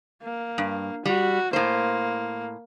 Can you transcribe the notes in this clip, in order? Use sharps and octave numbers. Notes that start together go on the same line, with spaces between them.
A#3
G2
G3 F#4
A2 A#3 C5